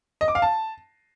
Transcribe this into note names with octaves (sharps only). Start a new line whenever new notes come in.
D#5
D6
F5
A5